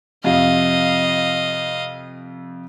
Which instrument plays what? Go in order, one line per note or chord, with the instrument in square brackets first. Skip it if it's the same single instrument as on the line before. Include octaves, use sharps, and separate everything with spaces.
[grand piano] F2 C3 F4 [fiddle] D#5 F5